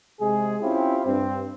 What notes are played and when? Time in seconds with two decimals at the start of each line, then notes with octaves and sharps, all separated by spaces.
0.21 C3 G#3 G#4
0.62 C4 C#4 E4 F4 G4
1.06 G2 C4